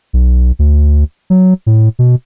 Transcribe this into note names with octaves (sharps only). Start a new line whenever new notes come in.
B1
D2
F#3
A2
B2